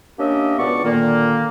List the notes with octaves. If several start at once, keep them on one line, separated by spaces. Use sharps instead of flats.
A#3 C#4 D4 G4 D#5 E5
C#2 B2 B3 D4 D5 C#6
A#2 D3 D#3 A#3